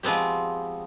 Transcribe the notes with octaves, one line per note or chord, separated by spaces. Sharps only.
F3 G#3 B3 C4 G4